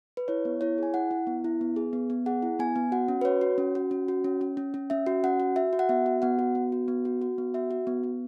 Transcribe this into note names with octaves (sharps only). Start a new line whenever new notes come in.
B4
E4 C#5
B3
E4 C#5
G#4 G#5
E4 F#5
E4
B3
E4
B3
G#4
B3
B3
G#4 F#5
E4
B3 G#5
B3
F#4 F#5
C#4
B4
F#4 C#5
F#4
C#4
F#4
C#4
F#4
C#4
C#4
C#4
C#4
C#4 E5
F#4
C#4 F#5
F#4
F#4 E5
F#4
F#5
B3 E5
F#4
B3 F#5
F#4
B3
F#4
B3
F#4
F#4
B3
F#4 E5
F#4
B3
B3